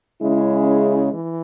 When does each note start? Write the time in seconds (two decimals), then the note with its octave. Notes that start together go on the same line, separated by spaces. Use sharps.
0.21 C#3 G#3 C#4 E4
1.12 E3